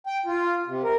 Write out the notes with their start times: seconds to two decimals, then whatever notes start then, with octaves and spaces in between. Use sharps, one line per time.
0.06 G5
0.26 F4
0.67 C3
0.84 A#4